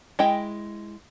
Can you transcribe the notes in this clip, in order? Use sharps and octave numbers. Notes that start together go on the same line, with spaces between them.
G#3 E4 D#5 G5